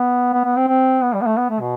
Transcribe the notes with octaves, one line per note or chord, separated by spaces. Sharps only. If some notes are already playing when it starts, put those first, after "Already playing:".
Already playing: B3
B3
B3
C4
C4
B3
G3
B3
A3
B3
A3
B2